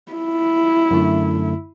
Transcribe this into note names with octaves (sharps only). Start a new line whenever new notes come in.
E4
F#2 D3 A3